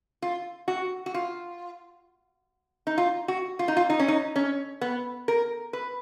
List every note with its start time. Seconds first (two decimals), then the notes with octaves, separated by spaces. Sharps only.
0.22 F4
0.68 F#4
1.06 F#4
1.14 F4
2.87 D#4
2.98 F4
3.28 F#4
3.59 F4
3.68 D#4
3.77 F4
3.90 D#4
3.99 C#4
4.08 D#4
4.36 C#4
4.81 B3
5.28 A#4
5.73 B4